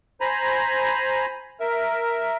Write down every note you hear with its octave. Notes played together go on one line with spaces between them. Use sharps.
C5 G#5 A#5 B5
A#4 E5